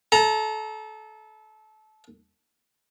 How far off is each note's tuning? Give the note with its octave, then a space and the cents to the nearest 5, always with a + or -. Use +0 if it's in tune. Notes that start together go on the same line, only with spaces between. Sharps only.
A4 -25 A#5 +0